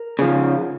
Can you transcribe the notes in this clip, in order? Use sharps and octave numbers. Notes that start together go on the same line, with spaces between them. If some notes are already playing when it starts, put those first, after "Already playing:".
Already playing: A#4
C#3 F3